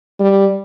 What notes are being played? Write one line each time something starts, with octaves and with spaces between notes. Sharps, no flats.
G3